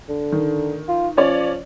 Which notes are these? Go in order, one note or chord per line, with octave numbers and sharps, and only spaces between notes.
D3
D#3
F4
F3 C#4 C#5 D5